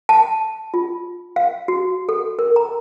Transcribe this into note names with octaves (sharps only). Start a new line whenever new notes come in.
A5
F4
F5
F#4
A4
A#4
A#5